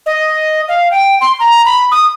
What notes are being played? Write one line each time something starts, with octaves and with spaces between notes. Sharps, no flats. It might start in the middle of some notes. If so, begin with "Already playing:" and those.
D#5
F5
G5
C6
A#5
B5
D#6